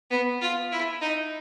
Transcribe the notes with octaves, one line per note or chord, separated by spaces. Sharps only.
B3
F4
E4
D#4